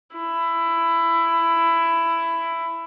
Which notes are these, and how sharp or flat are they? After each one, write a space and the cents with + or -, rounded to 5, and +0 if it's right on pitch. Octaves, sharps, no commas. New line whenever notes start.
E4 +15